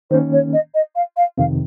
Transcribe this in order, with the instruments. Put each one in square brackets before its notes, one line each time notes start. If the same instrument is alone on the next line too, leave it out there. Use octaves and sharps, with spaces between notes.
[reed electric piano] D#3 A#3 C#4 [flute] C5
[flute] C#5
D#5
D#5
F5
F5
[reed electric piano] F2 C3 D#3 [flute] F5